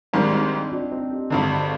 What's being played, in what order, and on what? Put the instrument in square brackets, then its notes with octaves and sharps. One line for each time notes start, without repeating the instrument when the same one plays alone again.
[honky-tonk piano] G#1 G#2 D#3 G3 [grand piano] D4
[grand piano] C4 D#4
D4 F4
C4 D#4
D#4 G4
[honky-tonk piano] G#1 G2 D3 [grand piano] D#4 G4